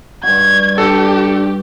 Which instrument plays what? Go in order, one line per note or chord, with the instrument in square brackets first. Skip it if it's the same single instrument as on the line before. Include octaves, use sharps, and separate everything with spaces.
[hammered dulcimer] G2 F#4 [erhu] G#6
[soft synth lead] D4 [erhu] G4 [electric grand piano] A4